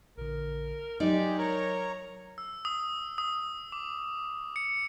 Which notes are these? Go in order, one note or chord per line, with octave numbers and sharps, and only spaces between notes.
A#1 D3 A#4
F#3 G#3 D#4 G4 D5
A#4 C#5 A#5
E6
D#6
D#6
D6
C#7